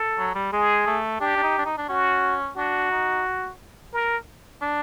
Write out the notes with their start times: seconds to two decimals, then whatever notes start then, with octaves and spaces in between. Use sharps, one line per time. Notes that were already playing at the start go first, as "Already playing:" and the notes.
Already playing: A4
0.19 F#3
0.35 G3
0.52 G#3 G#4
0.87 A3
1.20 D4 G4
1.37 D4
1.43 D#4
1.58 D4
1.66 D#4
1.78 D4
1.89 C#4 F#4
2.57 D4 F#4
2.91 D#4
3.93 A#4
4.62 D4